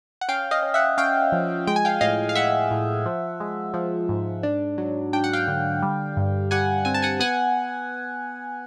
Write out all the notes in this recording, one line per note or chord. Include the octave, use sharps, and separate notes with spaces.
F#5
C#4 F5 G5
D#5 F5
C#4
E5 F#5
C#4 F5 G5
F3
G#3 G5
G#5
F5 G5
A2 D#5 F5
F5
G#3 E5 F#5
A2
F3
G#3
F3
G#2
D4
F#3
D4 G5
F#5
F5 G5
D3
G3
G2
G3 F#5 G#5
C4 G#5
A5
F#5 G#5
B3 F#5 G#5